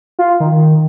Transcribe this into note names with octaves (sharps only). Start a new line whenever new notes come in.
F4
D#3